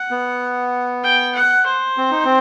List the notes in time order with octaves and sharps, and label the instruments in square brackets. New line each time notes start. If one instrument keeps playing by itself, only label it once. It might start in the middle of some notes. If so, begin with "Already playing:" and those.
Already playing: [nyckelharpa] F#5
[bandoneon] B3
[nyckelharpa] G5
F#5
C5
[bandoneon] C4
D#4
C4